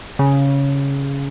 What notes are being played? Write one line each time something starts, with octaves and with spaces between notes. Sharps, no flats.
C#3